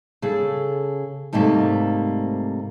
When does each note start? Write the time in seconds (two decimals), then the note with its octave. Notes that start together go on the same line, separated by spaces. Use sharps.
0.22 C#3 G#4 A4
1.33 G#2 C3 G3 A3 A#3